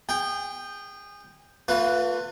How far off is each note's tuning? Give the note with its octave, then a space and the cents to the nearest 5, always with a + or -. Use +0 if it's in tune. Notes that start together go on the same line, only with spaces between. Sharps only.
G#4 -30 G5 +0
A3 +45 F4 +30 B4 +0